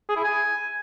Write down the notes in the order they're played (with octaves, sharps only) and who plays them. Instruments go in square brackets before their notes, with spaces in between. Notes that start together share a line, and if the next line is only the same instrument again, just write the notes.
[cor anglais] G#4
E4
G#5